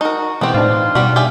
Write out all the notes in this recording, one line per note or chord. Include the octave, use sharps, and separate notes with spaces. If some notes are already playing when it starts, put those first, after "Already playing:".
D#4 F#4 A#4
B2 E3 G#3 B3 C4 G4
A2 D4 D#4 F4 F5
B2 G3 F#4
G4 G#4 E5